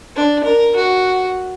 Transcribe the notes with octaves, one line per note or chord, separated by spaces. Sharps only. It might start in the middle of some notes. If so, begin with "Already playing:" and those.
D4
A#4
F#4